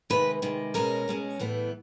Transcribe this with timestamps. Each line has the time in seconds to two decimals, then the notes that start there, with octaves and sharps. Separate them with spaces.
0.10 C3 D#3 G#3 B4
0.42 C3 D#3 G#3
0.74 B2 G#3 C#4 A#4
1.08 B2 G#3 C#4
1.39 A2 E3 G3 B3